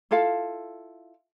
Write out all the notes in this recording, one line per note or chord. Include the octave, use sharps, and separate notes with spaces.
E4 F4 A4 F5